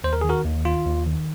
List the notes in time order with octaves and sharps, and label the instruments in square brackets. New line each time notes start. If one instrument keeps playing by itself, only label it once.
[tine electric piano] D#2 C5
A#4
D#3 G#4
F#4 A#4
D#2
D#3 F4
D#2
D#3